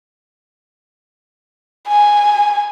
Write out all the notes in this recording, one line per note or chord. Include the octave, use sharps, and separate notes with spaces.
G#5